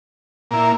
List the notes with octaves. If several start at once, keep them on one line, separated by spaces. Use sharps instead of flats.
A#2 A#3 E4